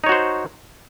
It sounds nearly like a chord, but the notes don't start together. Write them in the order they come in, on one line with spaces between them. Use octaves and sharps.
D#4 C#5 F#4 C5